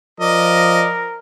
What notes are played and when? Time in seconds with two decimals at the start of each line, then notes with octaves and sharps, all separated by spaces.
0.20 F3 A#4 D5 D#5